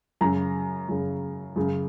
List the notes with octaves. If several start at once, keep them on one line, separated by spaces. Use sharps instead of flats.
F#2 C#3 A#5
F#2 C#3
F#2 C#3